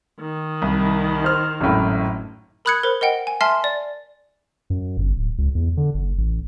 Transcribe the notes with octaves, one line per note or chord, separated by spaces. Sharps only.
D#3
C2
C5 F6
G#1 F#2 A2
A#4 B5 D#6 F#6 G#6 C#7
A#4 C5 B5
A#4 D#5 F#5 G5
G#5
E5 G#5 A5 C6 F6 C7
D5
F#2
G1
D1
C#2
E2
D3
F#1
A1